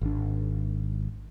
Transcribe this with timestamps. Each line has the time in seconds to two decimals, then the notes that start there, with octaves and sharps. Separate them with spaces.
0.02 G#1 D4